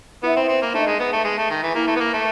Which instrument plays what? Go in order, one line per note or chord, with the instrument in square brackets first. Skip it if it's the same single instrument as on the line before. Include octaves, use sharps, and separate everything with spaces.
[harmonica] B3 [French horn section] E4
[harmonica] C4
C4
A#3
[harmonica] A3 [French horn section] D#4
[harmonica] G#3
B3
A3
G#3
A3
D#3
E3
[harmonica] A#3 [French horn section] E4
[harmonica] A3
B3
A#3
A3